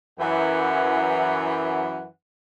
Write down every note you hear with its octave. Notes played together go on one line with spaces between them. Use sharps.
F#2 E3 F#5